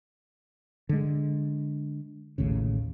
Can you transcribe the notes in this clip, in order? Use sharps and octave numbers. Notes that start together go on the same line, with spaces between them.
D3 G#3
A1 D#2 A2 C#3